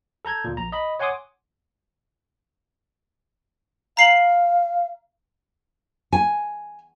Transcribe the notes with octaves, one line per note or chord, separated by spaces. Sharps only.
A4 A#5 G6 G#6
D2 A#2
A#1 A#5
D#5 B5
C#5 F#5 G#5 C6 D6 D#6
F5 A#5 C7 F#7
G#5